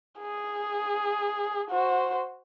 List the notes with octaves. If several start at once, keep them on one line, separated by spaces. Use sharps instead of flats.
G#4
F#4 C5